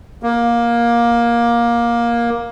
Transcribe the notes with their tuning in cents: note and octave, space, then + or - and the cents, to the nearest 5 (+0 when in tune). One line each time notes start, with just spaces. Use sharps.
A#3 +15